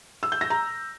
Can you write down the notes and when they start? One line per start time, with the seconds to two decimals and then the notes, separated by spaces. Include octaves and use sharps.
0.23 E6
0.32 G6
0.41 A#6
0.50 A#5